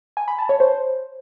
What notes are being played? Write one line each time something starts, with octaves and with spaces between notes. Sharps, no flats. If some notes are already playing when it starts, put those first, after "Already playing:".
G#5
B5
A5
C#5
C5